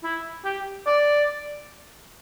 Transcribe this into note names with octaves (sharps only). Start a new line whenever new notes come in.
E4
G4
D5